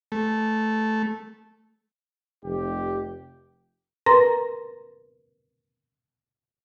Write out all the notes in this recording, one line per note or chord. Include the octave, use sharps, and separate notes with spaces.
A3
F1 G4
A#4 B4 A#5 C6 A#6